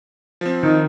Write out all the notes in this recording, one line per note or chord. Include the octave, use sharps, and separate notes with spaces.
F3 C4
D#3 D#4